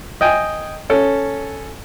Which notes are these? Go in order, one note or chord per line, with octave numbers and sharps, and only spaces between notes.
D#5 G5 G#5
C#4 A4